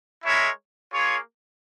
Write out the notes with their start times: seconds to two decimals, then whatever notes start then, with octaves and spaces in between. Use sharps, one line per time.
0.24 G#3 E4 A#4 C#5 E5
0.93 A#3 F4 G#4 C#5